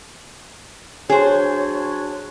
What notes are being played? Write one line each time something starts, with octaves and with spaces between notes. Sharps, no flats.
F#3 D4 G#4 C5 C#5